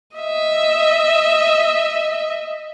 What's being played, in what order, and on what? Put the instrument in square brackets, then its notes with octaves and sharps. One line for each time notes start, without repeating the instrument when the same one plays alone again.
[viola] D#5 E5